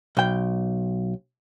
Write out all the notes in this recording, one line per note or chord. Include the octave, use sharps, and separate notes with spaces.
B1 G5